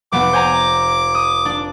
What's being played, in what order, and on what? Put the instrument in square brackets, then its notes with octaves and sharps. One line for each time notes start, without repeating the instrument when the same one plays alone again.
[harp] F1 B3 [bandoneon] D6
[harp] C5 G#5 A#5
D#6
D4